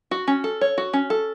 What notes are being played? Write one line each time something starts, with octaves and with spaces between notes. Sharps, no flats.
F#4
C#4
A4
C#5
F#4
C#4
A4